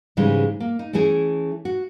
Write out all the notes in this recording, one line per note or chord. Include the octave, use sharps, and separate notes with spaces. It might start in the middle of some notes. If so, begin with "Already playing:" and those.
G#2 C#3 E3 G3 G#3
A#3
D#4
E3 A3 C#4 E4 G#4
F#4